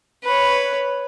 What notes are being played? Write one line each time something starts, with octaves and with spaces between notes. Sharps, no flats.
B4 C#5